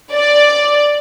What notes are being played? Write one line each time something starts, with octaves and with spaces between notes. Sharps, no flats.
D5